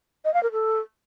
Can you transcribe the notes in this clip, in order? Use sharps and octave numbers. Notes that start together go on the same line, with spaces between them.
D#5
F5
A#4
A4